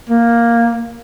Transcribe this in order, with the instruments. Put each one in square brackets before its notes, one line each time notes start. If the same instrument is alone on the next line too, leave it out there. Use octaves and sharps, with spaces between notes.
[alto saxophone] A#3